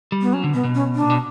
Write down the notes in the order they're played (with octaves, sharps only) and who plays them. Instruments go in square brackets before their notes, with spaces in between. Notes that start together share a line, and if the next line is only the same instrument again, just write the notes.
[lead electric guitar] G3
[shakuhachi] B3
[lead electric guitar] F#3 [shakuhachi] C#4
[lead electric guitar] D3
[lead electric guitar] B2 [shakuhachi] B3
[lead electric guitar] B2
[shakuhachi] C#4
D4
[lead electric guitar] A#2
B2